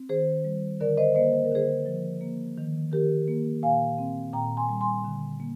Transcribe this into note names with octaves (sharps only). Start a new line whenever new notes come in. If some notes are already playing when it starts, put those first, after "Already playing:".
Already playing: C4
D#3 G#4 C5
G3
D3 A#4 D5
C5 D#5
A#3 C5 D#5
C5
A#4
D3 G#4 C5
F3
A#3
D#3
D#3 G4 A#4
A#3
A#2 F5 G#5
C4
A#2 G5 A#5
G#5 C6
G3
G#5 C6
D3
A#3